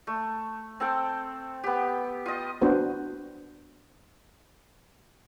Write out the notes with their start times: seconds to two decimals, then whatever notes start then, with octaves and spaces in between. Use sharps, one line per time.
0.07 A3
0.80 C4 A4 G5
1.63 B3 G4
2.26 F4 D#5
2.62 B3 D4 F4 F#4 B4 C5